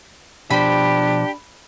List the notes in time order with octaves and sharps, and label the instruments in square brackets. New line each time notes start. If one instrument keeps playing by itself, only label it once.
[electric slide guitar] B2 F3 C5 [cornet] D4 [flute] G4 [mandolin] B5